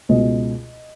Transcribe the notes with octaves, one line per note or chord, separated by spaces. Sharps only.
C#2 B2 D#5